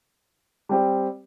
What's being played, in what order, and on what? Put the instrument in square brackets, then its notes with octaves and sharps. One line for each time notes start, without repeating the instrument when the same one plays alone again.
[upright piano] G3 C4 G4